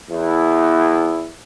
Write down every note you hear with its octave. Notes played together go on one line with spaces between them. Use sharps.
E2 E4